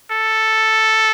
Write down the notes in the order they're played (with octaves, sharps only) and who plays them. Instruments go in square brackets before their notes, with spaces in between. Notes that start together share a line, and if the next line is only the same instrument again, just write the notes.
[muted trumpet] A4